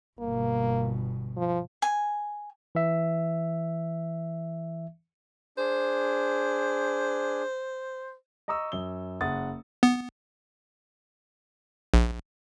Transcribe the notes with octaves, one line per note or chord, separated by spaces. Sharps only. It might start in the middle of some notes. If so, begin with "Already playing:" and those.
G1 B2 A#3
F3
G#5
E3 E5
D4 G#4 C5
D#5 A#5 C#6 D#6 E6
F#2 G7
F#1 F#5 D#6 A6
B3
A#1